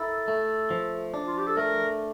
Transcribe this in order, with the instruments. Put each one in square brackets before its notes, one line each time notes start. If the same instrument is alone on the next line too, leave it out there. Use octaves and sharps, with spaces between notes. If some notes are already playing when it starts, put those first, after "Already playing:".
Already playing: [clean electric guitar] E4 A#4 [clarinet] A4
[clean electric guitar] A3
F3
D4
[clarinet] F4
G4
A4
[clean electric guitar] A3 [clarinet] A#4